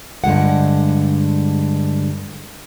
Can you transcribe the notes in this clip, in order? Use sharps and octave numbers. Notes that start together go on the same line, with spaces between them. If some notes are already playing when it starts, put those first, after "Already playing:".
G2 D3 G#3 F#5